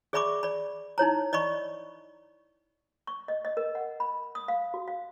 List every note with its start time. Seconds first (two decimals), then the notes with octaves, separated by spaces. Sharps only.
0.13 G#4 D5 E5 B5 C#6 D6
0.43 D5 B5
0.98 D#4 E4 C#5 A#5
1.33 D5 D#5 B5 C#6
3.07 C#6
3.28 D#5
3.45 D#5
3.57 A#4
3.75 F#5
4.00 B5
4.35 D#6
4.48 F5
4.74 F#4
4.88 F5